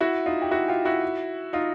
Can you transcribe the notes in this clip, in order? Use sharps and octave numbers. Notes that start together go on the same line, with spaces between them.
E4 F#4
D#4 F4
G4
E4 F#4
F4 G4
E4 F#4
D#4 F4